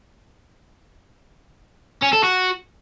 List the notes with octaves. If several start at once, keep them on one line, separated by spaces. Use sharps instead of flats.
C#4
A4
F#4